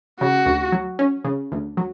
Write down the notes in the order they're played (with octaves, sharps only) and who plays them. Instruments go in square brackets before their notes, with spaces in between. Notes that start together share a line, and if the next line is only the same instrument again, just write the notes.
[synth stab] C#3 [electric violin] F#4
[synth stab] D2
F#3
C#4
C#3
D2
F#3